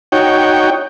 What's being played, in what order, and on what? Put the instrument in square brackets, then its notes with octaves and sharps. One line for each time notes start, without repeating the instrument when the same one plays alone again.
[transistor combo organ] D#4 F#4 C#5 G5